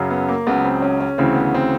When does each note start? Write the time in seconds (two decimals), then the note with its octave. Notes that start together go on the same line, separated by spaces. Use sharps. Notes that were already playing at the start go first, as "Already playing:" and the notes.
Already playing: F#2 C#3 F#3
0.10 B3
0.29 A#3
0.47 C#2 C#3 F#3 B3
0.65 C4
0.82 C#4
1.00 C#4
1.18 D2 C#3 E3 C4
1.36 B3
1.55 C4